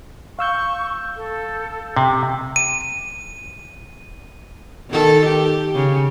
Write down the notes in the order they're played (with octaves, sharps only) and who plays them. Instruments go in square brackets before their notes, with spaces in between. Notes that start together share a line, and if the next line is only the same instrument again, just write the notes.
[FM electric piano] F5 E6 G6 [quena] C#6
[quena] A4
[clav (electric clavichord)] C3
[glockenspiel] D#7
[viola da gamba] D#3 A4
G4
C#3